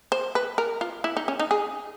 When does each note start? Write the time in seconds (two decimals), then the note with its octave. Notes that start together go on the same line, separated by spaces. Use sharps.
0.12 C5
0.35 B4
0.58 A#4
0.81 F4
1.04 E4
1.17 D#4
1.28 C#4
1.39 D#4
1.51 G#4